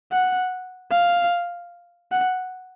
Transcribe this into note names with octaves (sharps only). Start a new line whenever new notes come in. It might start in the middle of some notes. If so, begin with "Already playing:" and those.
F#5
F5
F#5